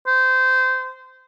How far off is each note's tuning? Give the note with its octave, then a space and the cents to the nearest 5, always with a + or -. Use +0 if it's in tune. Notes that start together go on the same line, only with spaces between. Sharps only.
C5 -20